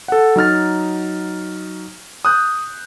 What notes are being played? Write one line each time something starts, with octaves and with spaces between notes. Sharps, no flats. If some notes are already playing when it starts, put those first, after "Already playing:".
A4 F#5
F#3 D#4 F6 A6
D#6 F#6 G6